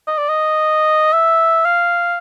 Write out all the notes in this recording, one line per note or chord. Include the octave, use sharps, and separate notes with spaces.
D#5
D5
D#5
E5
F5